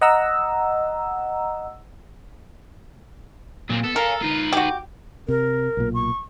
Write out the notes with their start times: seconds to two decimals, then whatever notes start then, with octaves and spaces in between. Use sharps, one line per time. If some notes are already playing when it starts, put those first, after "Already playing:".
0.01 D#5 F#5 A#5 E6
3.70 A#2 F#3 C4
3.84 B3 A4
3.96 A#4 F5 G#5
4.22 D#4 F4 B4
4.53 F#4 G4
5.28 C3 A#4
5.77 B1 A#2
5.94 C#6